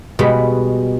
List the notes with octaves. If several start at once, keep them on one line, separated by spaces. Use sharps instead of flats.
B2 G3 G#3 B3